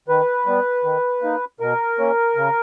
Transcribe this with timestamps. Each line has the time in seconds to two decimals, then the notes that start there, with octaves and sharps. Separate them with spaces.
0.08 D#3 B4
0.46 G3 B3
0.84 D#3
1.22 A#3 D#4
1.60 B2 A#4
1.98 A#3 C#4
2.36 C#3